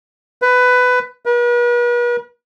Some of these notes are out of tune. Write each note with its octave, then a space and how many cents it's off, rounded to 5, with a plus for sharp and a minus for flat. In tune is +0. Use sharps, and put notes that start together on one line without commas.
B4 +15
B4 -45